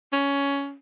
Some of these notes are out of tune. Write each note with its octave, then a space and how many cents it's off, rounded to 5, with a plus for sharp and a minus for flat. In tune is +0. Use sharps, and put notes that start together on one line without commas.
C#4 +15